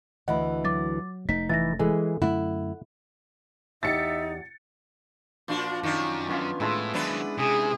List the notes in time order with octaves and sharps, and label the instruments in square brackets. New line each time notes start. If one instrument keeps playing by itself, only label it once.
[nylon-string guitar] D2 E3 [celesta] D#5 B5 [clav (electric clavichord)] F#5
[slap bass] F#3 [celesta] D6 A6
[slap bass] F1 A3 [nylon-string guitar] D#4 [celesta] B6
[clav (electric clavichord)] E3 E4 [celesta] A6 A#6
[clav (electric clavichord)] E3 G#4 [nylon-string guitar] G#3 [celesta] A4
[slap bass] F#2 D3 A3 [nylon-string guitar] E4 [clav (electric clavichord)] F#5
[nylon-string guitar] E2 G4 [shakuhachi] D#4 [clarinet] E5 [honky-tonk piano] A6 C#7
[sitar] A#2 D4 F#4 [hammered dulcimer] F3
[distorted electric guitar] F#2 [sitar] D#3 D4
[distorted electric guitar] F#2 [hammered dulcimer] B3 C#4 F4
[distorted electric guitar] A2 [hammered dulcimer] G#3 E4 A5
[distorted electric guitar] D#3 F#3 [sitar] B3 D4 B4
[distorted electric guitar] C3 [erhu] G#4